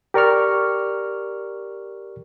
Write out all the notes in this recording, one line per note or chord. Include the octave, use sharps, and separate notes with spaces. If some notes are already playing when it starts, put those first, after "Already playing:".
G4 A#4 D5 C#6 F6